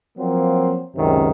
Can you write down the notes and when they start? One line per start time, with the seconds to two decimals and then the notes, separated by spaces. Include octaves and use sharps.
0.17 F3 F#3 A#3 C4
0.94 C#2 F#2 C3 D#3